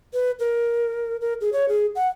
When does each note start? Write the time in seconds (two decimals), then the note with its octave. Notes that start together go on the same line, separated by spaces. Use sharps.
0.14 B4
0.40 A#4
1.21 A#4
1.41 G#4
1.53 C#5
1.69 G#4
1.95 F#5